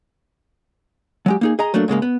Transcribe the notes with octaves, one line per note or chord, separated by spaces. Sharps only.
F#3 G#3 G4
A#3 D#4 G#4
G#4 D#5 A#5
F#3 A3 A#3 D4
G#2 C#3 G#3 A#3
B3